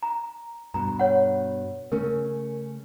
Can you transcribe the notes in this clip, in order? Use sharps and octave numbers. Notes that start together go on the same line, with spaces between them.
A#5
G2 B2 A#5
C#5 F#5
C#3 A3 C#4 A#4